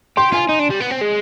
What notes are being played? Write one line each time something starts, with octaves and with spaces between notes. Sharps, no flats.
G4 C6
F4 G#5
D#4
D4
G3
B3
C4
G#3